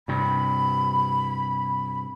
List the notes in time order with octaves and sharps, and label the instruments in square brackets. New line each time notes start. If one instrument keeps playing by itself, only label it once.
[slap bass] G2 C3 [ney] B5